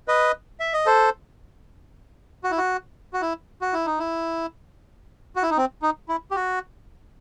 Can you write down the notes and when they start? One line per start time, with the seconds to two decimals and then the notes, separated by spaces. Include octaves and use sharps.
0.08 B4 D#5
0.60 E5
0.73 D#5
0.86 A4 C5
2.44 F#4
2.51 E4
2.58 F#4
3.13 F#4
3.22 E4
3.61 F#4
3.73 E4
3.86 D#4
3.99 E4
5.36 F#4
5.43 E4
5.50 D#4
5.57 C4
5.82 D#4
6.09 E4
6.31 G4
6.36 F#4